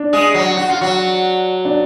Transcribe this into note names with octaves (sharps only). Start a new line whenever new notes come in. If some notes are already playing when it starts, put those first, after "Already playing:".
Already playing: D4
G#3 G#4
F#3 F#4
F#4
F4
F#3 F#4
D4